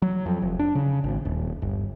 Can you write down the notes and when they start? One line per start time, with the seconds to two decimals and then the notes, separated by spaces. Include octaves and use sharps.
0.02 F#3
0.26 F2
0.42 F1
0.59 D4
0.75 C#3
1.04 G#1
1.25 D#1
1.62 G1